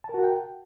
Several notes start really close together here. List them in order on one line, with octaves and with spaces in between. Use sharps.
A5 A#4 F#4 F#5 G5